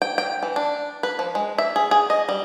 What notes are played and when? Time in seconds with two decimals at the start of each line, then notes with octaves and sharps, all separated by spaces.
0.02 G5
0.18 G5
0.43 E3
0.56 D4
1.03 B4
1.19 F3
1.35 G#3
1.58 E5
1.76 G#4
1.91 G#4
2.10 D#5
2.29 G3